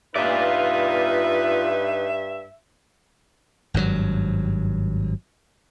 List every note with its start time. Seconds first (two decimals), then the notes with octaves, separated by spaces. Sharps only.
0.16 G2 D#4 F4 B4 D5 E5
3.74 G#1 G2 B2 F#3